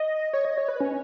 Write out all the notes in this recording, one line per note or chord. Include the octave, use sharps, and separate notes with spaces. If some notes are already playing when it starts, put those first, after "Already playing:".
Already playing: D#5
C#5
D#5
C#5
B4
C#4